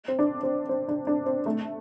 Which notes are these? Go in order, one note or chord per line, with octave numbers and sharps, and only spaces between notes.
C4
D4
C4
C4
D4
D4
C4
A3